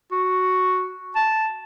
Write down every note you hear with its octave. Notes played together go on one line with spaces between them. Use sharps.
F#4
A5